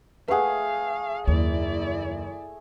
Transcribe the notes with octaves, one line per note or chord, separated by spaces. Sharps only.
A3 G#4 B4 F5 F#5
F#1 D#2 E4 D5